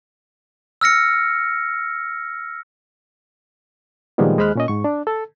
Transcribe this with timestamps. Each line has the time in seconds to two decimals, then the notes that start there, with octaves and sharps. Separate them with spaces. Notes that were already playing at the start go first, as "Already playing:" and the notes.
0.81 E6 F6 A#6 C#7
4.18 A#2 D#3 F3 G3 G#3 B3
4.38 D#2 G#3 C5 B5 F6 F#6
4.55 A#2 C#4 D#5
4.68 G#2 C#6
4.84 D4
5.07 A4